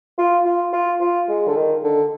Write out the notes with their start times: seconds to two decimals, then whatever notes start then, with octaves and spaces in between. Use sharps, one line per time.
0.18 F4
0.45 F4
0.73 F4
1.01 F4
1.29 G#3
1.48 D3
1.56 D#3
1.84 D3